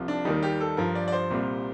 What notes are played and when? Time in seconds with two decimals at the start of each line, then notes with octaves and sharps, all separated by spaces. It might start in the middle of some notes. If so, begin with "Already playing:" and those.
Already playing: C2 F3
0.08 D4
0.25 D#2 D#3 G3 D#4
0.43 G4
0.61 A4
0.77 G2 F3 A#4
0.95 D5
1.08 D5
1.12 C5
1.31 C2 A#2 G3